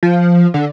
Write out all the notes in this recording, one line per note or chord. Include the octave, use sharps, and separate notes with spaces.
F3
D3